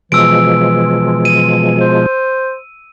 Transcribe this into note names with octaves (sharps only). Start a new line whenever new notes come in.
B2 E3 F3 G#3 E6 D7
D#7
C5